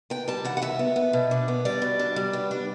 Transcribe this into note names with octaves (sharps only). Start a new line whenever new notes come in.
B3 G5
G3 A5
E3 F#5
F#5
B3 E5
B3
B3
B2
D4
B3
G3 D5
B2
D4
G3
B3
D4